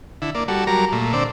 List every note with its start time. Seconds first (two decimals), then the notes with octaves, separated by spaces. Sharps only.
0.22 D3 E4
0.35 A#3 D5
0.48 G3 F#4 A4
0.67 F#3 G3 A#4 A#5
0.92 A#2 A3
1.13 D3 C4 D5